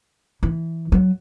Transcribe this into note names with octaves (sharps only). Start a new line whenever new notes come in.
E3
F#3